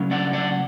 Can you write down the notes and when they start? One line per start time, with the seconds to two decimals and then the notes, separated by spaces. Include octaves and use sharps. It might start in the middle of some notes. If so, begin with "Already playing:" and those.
Already playing: D2 C#3 F#3 C#4
0.11 D5 F#5
0.33 D5 F#5